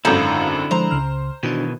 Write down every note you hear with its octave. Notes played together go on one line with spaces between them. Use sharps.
G#1 F#2 D3 D#4 E4 A4 F5
F3 G#3 C5 A#5
C#2 C#3 F6
B2 D#3 E3 D4 F#4